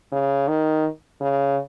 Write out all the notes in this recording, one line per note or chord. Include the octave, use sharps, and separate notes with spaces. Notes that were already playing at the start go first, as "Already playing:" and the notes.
C#3
D#3
C#3